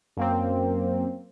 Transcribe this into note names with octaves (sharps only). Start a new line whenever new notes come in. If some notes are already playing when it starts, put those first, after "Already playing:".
F#2 A#3 C4